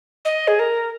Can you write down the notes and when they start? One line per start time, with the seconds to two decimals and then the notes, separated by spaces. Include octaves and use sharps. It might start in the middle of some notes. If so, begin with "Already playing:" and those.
0.25 D#5
0.48 G#4
0.59 A#4